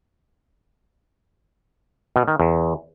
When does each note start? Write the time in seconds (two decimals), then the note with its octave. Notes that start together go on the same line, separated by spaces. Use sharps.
2.16 B2
2.28 D#3
2.40 E2